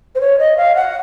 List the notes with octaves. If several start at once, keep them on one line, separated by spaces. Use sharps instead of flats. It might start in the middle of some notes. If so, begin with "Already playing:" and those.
C5
C#5
D#5
F5
F#5